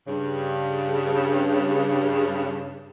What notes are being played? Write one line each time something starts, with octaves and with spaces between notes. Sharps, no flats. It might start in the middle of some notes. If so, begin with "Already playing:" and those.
G2 C#3